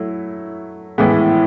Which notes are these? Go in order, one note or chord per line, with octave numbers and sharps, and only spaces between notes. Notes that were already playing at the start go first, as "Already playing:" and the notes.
Already playing: F#3 A3 E4
A2 E3 G#3 B3